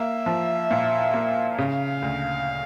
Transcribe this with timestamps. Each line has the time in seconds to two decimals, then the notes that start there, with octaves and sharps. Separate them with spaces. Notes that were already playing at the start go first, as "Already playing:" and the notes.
Already playing: A#3 E5
0.26 F3
0.71 A#2
1.13 A#3
1.58 C#3 F5
2.02 D2